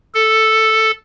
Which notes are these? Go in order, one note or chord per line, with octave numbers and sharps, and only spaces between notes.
A4